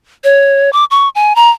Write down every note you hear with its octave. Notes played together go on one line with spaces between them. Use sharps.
C#5
D6
C#6
G#5
A#5